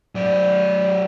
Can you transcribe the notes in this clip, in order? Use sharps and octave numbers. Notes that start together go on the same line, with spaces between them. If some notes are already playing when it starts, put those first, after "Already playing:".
F#3 D5